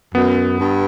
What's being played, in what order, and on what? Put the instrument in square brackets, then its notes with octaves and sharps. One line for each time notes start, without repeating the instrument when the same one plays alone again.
[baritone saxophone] F#2 [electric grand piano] B3
[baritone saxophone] G2